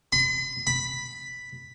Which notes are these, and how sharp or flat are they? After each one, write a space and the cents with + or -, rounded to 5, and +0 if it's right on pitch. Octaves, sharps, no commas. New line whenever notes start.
B5 +45
B5 +0